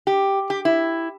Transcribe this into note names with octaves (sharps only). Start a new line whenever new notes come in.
G4
G4
E4